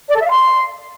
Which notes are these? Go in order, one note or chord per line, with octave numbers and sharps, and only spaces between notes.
D5
A4
E5
F5
C6